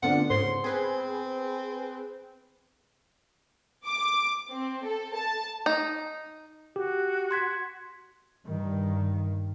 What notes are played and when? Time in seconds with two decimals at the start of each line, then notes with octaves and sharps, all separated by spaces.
0.03 D3 B3 C4 D4 F4 F#5
0.30 G#2 C#3 C5 C6
0.64 C4 G#4 B4
3.86 D6
4.50 C4
4.84 A4
5.15 A5
5.66 D#4
6.76 F#4 G4
7.31 C6 G#6 B6
8.46 G2 D#3